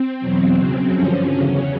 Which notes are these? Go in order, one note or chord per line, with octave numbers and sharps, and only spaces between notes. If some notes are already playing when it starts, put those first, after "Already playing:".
Already playing: C4
E2 B2 F#3
F#2 C#3 F#3
G2 D3 F3 C#4
E2 C#3 F#3